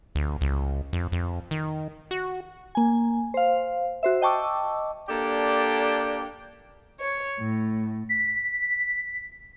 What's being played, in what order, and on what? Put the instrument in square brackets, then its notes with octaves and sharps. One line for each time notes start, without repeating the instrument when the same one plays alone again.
[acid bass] D2
C#2
F2
F2
D#3
F#4
[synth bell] A#3 G#5
C5 F5
F#4 C5 E5
D#5 G5 A5 C#6 D6 E6
[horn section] A#3 D4 G4 A4 D5 G5
[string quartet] C#5
A2
[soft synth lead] B6